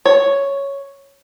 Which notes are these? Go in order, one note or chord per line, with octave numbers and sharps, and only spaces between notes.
C#5